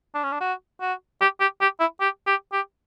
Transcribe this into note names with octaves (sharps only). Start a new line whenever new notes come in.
D4
C#4
D4
F#4
F#4
G4
G4
G4
E4
G4
G4
G4